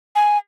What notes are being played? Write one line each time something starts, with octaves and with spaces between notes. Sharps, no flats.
G#5